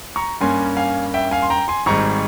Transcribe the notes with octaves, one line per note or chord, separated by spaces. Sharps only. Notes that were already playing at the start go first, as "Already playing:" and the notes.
A#5 C#6
G2 G3 A#3 C#4 G#5 C6
F5 G#5
E5 G5
F5 G#5
C6
G5 A#5
G#5 C6
G#1 G#2 G3 A#5 C#6